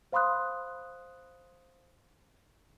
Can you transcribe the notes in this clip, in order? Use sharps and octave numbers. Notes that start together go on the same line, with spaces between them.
C5 F5 B5 C6 D#6 F#6